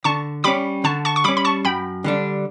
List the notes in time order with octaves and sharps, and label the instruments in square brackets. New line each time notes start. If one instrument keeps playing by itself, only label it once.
[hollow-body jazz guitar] D3 [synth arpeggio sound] A5 C#6
[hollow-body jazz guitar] G3 C#4 [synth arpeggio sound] B5 D6
[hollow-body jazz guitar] D3 [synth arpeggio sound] A5 C#6
[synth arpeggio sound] A5 C#6
C#6
[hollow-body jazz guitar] G3 C#4 [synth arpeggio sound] B5 D6
[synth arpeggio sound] B5
A5 C#6
[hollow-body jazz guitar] F#2 [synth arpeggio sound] G5 B5
[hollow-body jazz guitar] D3 G3 D4